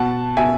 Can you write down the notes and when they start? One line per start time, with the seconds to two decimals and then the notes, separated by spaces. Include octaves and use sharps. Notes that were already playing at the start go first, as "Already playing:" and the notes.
Already playing: B2 F#5 A5
0.37 B2 E5 G#5